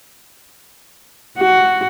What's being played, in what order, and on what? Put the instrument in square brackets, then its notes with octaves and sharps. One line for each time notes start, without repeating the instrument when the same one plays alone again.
[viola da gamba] F#4